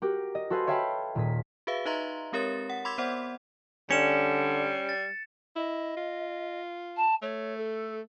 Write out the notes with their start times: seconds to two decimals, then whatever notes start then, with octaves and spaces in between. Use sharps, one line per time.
0.02 F#4 G4 A#4
0.35 D#5
0.50 F#4 A4 B4 C5 F5 G#5
0.67 C#5 E5 F5 G5 A5 B5
1.15 D#1 A#2 A#3 G#4 B6
1.67 F#4 G#4 B4 E5 F5
1.85 D#4 B4 D#5 E5 A#5 C6
2.32 G#3 C4 G4 A#4 C#5 A6
2.70 F#5
2.85 B5 C6 D6 E6 G#6 B6
2.98 B3 C5 D5 F#5
3.91 D3 G3 C#4 C#7 E7
4.89 A6
5.56 E4 D#5
5.97 F4
6.96 A5
7.22 A3 C#5
7.58 A4